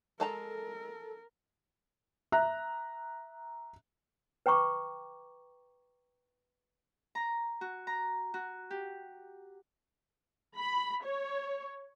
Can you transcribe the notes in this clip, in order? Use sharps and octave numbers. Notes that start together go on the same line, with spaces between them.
G#3 A4 A#4 A5 A#5
E5 A#5 F#6
B4 G5 A#5 C#6 D6
A#5
F#4
A#5
F#4
G4
B5
C#5